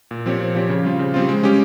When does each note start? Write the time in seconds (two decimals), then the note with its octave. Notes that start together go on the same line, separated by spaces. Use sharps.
0.11 A#2
0.26 F3 C4 G4 C#5
0.40 A#2
0.55 F3 C4 G4 C#5
0.69 C#3
0.84 G3 C4 F4
0.99 C#3
1.14 G3 C4 F4
1.29 G#3
1.43 C#4 G4